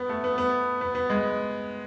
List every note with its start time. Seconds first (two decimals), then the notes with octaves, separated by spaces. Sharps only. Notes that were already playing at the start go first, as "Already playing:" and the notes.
Already playing: B3
0.09 A3
0.24 B3
0.38 B3
0.81 B3
0.95 B3
1.10 G#3